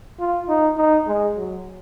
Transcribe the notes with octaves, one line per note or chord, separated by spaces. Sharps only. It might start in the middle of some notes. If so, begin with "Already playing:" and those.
F4
D#4
D#4
G#3
F#3